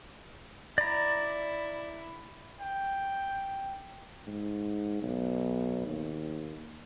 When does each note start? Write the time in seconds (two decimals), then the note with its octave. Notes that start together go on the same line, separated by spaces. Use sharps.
0.78 E4 D5 A#5
2.60 G5
4.27 G#2
5.02 B1
5.87 D#2